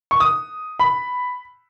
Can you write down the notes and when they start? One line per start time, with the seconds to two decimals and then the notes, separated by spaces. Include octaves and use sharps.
0.11 C#6
0.20 D#6
0.79 B5